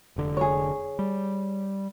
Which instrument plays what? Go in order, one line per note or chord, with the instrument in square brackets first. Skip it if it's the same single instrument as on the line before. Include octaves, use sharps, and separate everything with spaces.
[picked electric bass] F1 D3
[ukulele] G#4 C#5
[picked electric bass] G3